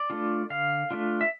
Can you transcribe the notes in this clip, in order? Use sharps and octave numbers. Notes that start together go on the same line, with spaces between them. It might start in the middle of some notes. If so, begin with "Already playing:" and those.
Already playing: D5
A3 D4 F4
D3 F5
A3 D4 F4
E5